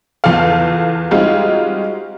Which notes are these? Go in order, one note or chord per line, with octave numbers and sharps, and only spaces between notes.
E2 F4 A4 F5
G3 G#3 C4 D#4 F4 F#4